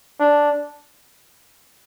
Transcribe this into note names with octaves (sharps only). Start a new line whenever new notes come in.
D4